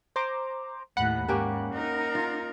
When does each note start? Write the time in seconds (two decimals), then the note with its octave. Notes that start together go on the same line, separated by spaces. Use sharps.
0.16 C5 A#5 D6
0.97 D#2 A2 F#5 B5 F#6
1.28 G#2 A#3 C#4 G4
1.74 D#4 A#4
2.15 F4